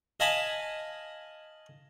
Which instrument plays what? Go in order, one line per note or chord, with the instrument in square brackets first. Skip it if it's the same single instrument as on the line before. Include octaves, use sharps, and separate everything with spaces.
[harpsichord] D#5 F5 G#5 A5 B5 D#6